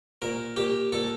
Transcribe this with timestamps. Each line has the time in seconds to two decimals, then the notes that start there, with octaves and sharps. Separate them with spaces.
0.22 A#2 A#4
0.56 A#2 G4
0.92 A#2 A4